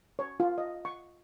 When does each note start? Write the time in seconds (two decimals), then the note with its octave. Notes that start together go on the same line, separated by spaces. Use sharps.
0.19 C#5
0.40 F4
0.58 D#5
0.85 C#6